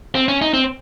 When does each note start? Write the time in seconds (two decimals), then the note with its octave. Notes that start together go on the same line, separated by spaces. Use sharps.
0.15 C4
0.28 C#4
0.42 D#4
0.54 C4